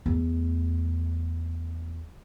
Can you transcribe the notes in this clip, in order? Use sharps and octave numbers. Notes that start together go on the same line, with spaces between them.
E2 A3